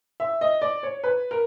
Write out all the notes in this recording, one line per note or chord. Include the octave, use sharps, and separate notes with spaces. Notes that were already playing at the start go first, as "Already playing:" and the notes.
E5
D#5
D5
C#5
B4
A#4